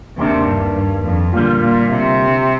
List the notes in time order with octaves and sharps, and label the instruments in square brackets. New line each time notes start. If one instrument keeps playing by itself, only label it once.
[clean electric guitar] D#2 D#3 A#3 D4 [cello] C3
[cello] G2
G2
F2
[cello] A#2 [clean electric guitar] D3 G3 A#3 F4
[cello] A#2
C3